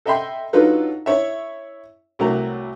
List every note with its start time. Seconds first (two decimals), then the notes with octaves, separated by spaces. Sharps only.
0.06 A4 D#5 E5 G5 B5 C6
0.53 F#3 D4 D#4 F4 A4 B4
1.06 E4 C#5 E5
2.19 C2 F#3 A3 A#3 E4 A#5